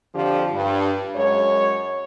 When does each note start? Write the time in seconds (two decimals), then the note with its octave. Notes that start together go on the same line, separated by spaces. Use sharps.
0.14 F2 D3 F3 G4
0.52 G2
1.15 F#2 G#3 C#5